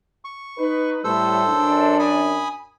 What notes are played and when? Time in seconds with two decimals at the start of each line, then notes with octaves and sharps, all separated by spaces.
0.25 C#6
0.58 D#4 B4
1.04 A2 G3 A4 C5 E6
1.47 F#2 D4
1.99 G#5 B5 D#6